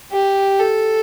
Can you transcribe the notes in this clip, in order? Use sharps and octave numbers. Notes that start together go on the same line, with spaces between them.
G4
A4